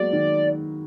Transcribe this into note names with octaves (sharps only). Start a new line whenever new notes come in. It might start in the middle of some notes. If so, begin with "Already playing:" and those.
Already playing: F#3 G#3 A#3 B3 D5
D#3